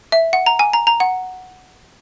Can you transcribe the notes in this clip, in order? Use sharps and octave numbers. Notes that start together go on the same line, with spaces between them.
E5
F#5
A#5
G#5
A#5
A#5
F#5